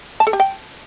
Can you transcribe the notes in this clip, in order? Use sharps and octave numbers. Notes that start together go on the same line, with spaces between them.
A5
A4
G4
G5